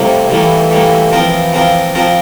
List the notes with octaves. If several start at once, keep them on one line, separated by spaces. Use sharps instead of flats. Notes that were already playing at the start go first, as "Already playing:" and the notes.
Already playing: A2 C3 G3 A#3
A2 E3 G3 A#3
A2 G3 A#3
E3 F3 C4 F4 A#4
F3 C4 F4 A#4
F3 C4 F4 A#4